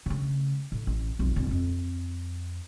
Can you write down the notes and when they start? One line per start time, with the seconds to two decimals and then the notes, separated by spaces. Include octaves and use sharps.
0.06 C#3 A3
0.72 A2
0.87 A1
1.19 B1 F2
1.36 D1 E4
1.51 F2